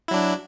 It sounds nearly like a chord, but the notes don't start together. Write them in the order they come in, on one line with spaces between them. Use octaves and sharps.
E4 F#3 D4